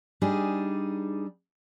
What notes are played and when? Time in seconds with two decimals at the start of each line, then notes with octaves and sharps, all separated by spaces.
0.21 G3 D4 D#4 G#4